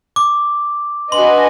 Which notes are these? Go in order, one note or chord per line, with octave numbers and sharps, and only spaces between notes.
D6
D4 F#4 B4 D#5 G#5 C6